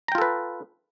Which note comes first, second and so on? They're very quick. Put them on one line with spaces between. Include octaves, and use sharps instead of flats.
A#5 G5 F4 A4 B4